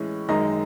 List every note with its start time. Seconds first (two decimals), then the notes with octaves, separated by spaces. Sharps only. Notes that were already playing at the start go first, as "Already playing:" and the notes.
Already playing: A2 E3 G#3 C#4
0.28 F#2 D#3 G#3 D#4 D#5